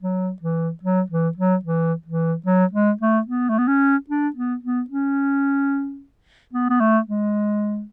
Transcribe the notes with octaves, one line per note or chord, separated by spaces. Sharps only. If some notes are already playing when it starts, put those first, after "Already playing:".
F#3
E3
F#3
E3
F#3
E3
E3
F#3
G#3
A3
B3
A3
B3
C#4
D4
B3
B3
C#4
B3
B3
A3
G#3